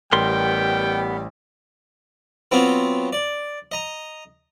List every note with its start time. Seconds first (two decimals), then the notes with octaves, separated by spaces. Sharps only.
0.13 A1 G3 B3 A#4 G5 C6
2.51 F#3 B3 C4 F4
3.13 D5
3.72 D#5 A#5